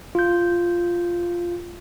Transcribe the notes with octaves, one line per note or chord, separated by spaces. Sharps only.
F4 G6